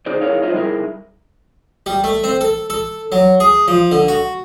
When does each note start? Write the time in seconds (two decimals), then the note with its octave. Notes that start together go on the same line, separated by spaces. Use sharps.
0.06 D#4 G#4 C5 D5
0.21 D#4 E4 G#4 A#4 C#5 F5
0.42 F#3 D#4 F4 C5 D#5 E5
0.54 G3 D#4 E4 G#4 A#4 E5
1.86 G3
2.04 A3
2.24 C4
2.41 A4
2.70 A4
3.12 F#3
3.40 G#4
3.68 F3
3.91 D3
4.08 F#4